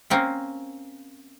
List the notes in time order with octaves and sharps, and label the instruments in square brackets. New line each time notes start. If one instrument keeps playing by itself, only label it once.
[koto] A#3 C4 C#4